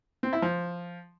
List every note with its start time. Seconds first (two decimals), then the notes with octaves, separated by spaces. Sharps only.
0.23 C4
0.33 E4
0.42 F3